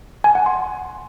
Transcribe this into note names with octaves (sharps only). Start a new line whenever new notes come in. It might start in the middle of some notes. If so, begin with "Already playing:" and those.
G#5
F#5
C6